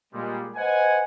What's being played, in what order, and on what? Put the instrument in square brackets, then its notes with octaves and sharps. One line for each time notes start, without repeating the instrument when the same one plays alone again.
[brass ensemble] A#2 G3 G#3
B4 C5 D#5 F#5 G#5